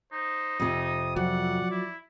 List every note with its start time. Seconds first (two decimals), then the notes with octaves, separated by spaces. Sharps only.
0.12 D#4 C5
0.60 F2 C3 D#6
1.16 F3 F#3 D5 F#5
1.71 E4